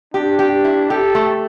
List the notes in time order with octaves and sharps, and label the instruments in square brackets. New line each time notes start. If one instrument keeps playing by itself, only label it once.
[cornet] D4 [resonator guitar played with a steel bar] G4
[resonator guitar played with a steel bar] G4
E4
[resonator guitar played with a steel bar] G4 [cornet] A4
[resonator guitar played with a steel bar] A3